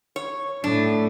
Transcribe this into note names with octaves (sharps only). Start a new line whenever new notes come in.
C#5
A2 D4